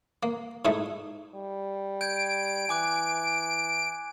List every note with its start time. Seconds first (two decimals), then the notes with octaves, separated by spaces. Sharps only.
0.23 A#3
0.65 G#2 A3 D#4 E4
1.35 G3
2.01 G6 G#6 D7
2.69 E3 G#5 D6 F#6